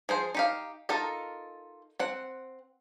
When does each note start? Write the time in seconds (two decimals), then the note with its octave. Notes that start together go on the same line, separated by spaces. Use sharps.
0.09 F3 G#4 C5
0.35 D#4 G4 F5
0.89 D#4 F4 A4 A#4 D#5
1.99 C4 F#5